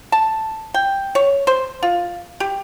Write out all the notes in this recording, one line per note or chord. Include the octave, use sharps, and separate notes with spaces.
A5
G5
C#5
C5
F4
G4